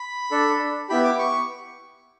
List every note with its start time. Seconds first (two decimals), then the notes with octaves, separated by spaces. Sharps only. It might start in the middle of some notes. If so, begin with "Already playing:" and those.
Already playing: B5
0.31 D4 A4
0.89 B3 E4 G4 B5
1.04 D6
1.19 C#6